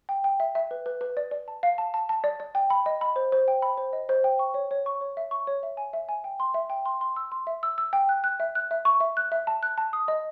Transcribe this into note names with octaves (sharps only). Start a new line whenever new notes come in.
G5
G5
E5
E5
B4
B4
B4
D5
D5
A5
F5
A5
A5
A5
D5
D5
G5
B5
D#5
B5
C5
C5
G5
B5
C5
D#5
C5
G5
C#6
C#5
C#5
C#6
C#5
E5
C#6
C#5
E5
G#5
E5
G#5
G5
C6
E5
G5
C6
C6
E6
C6
E5
E6
E6
G5
F#6
F#6
E5
F#6
E5
C#6
E5
F#6
E5
A5
F#6
A5
D#6
D#5